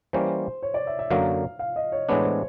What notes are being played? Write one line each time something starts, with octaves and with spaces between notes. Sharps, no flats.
E3 G3 A#3 C#4 C5
C#5
D5
E5
E5
F#2 D3 F#3 A#3 F5
F5
D#5
C#5
A2 E3 G#3 B3 D4 C#5
C5